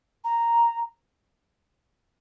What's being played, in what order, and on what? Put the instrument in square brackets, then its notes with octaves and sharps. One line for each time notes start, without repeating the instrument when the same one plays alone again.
[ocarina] A#5